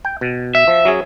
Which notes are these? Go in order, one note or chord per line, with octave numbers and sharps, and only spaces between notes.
G5
B2
E5
F3
F#3 C#4 G#4